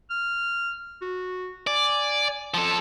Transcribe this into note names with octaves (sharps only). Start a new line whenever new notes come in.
F6
F#4
D5 G#5
F3 A4